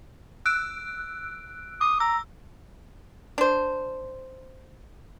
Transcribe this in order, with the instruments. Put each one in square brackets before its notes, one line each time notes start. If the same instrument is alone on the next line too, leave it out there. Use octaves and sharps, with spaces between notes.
[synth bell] E6 F#6 D7
[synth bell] D6 [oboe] D#6
[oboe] A#5 [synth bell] E6
[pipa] D4 C5